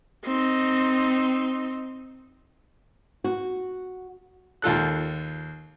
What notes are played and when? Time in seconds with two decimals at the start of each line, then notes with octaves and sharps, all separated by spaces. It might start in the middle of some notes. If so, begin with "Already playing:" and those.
0.25 C4 D#4
3.24 F#4
4.62 D#2 F4 A4 F#6